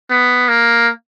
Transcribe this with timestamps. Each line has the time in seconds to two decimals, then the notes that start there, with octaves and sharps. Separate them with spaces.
0.10 B3
0.48 A#3